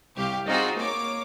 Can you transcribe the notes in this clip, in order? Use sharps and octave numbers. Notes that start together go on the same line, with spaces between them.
C2 G4 F5
C4 D#4 F4 F#4 G#4
A#3 C#5 D6